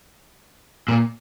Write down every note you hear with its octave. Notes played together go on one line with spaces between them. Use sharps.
A#2